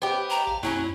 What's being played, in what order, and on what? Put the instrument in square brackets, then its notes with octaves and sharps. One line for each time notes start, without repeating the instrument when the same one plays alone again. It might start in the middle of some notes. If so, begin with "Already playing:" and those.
[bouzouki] B3 G4 [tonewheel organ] C5 C#5 D#5
[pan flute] A#5
[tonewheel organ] A#1 F5 A5
[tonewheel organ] F#2 A#3 [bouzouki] F#3 C4 C#4 [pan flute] E4